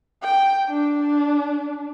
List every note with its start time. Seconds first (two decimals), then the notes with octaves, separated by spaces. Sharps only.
0.22 G5
0.69 D4